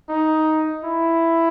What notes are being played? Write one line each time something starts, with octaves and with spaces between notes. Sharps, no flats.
D#4
E4